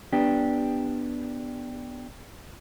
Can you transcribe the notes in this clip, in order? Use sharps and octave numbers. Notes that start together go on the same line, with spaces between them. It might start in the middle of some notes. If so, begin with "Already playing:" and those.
B3 D4 G4